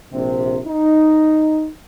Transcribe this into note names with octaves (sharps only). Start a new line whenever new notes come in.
A#1 C3
D#4